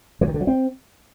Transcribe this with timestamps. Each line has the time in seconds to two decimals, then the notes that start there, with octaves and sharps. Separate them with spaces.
0.21 E3
0.28 D#3
0.34 D3
0.41 F#3
0.47 C4